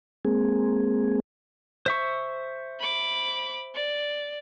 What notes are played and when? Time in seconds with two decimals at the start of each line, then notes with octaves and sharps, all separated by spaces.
0.25 G#3 A#3 C4 G#4
1.86 C5 E5 C#6
2.80 B5 D6
3.74 D5